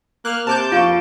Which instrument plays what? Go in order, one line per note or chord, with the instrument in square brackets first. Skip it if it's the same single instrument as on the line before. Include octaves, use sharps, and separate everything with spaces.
[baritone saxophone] A#3 [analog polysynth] F6 F#6
[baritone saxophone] C3 [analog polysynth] A5 D6 G6
[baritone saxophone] F2 [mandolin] A#3 A4 C#6 [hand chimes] F4 D7